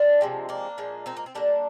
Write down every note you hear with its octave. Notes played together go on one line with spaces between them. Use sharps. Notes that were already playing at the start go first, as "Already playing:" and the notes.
Already playing: D4 F4
C3 F3 G#3
A#3 D4
A#2 F3 G#3
C4 D#4
A#3
C4
D3 G3 A#3 D4